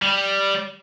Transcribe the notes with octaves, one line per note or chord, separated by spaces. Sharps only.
G3